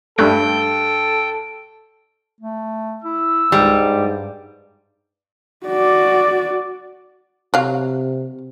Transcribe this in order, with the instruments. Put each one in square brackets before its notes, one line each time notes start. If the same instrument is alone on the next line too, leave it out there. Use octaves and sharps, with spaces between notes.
[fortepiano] G2 F#6 [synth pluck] A3 [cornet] A4 [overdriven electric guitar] G5
[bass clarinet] A3
[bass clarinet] E4 [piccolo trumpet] E6
[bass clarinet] C#2 [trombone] G#2 [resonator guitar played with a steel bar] G3
[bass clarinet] G2
[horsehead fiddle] F#4 D5
[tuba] C3 [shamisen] F#3 F5